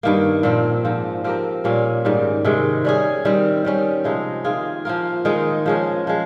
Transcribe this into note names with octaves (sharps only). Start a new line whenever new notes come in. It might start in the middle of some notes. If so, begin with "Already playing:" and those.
G2 D#3 A#3
A#2 F3 C4
G#2 F3 C4
F3 C4 G4 A#4
A#2 G3 A#3 C#4
G#2 D#3 G3
C3 D#3 G#3
G3 C#4 G#4
D#3 G3 C4
D#3 G3 C#4
C3 F3 G#3 D#4
D#3 A#3 F4 G#4
F3 A#3 F4 A#4
D#3 G#3 D#4
F3 G#3 C#4
F3 G#3